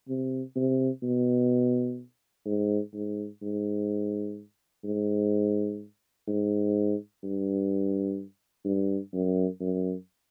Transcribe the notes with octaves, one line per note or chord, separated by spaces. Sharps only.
C3
C3
B2
G#2
G#2
G#2
G#2
G#2
G2
G2
F#2
F#2